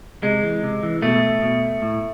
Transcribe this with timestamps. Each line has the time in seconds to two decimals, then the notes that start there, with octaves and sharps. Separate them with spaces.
0.23 C3 G#3
0.43 E3
0.63 C3
0.83 E3
1.02 B2 A3
1.42 B2
1.82 A2